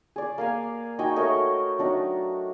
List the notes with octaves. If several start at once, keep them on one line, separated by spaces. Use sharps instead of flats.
G#4 D5
A#3 F5 G#5
D#4 F#4 G5 G#5
A3 A#4 C#5 D#5
F#3 D4 D#4